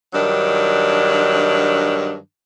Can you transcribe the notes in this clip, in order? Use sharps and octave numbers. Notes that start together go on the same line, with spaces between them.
G2 D#3 F#3 D4